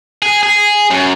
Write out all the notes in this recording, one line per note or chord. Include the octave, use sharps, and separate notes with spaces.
G#4
G#4
F#2